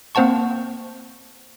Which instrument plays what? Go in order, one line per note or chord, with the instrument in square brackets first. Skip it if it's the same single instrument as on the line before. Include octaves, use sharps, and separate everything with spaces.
[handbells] A#3 C4 C5 F#5 A5 C#6